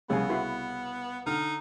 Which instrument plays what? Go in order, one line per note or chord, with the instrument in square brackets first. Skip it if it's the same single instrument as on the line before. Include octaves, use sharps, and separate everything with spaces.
[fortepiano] C2 C#3 [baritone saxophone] B3 [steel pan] G#4 G#5
[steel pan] E4 F#4 B4
[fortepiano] D3 F6 [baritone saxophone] D#4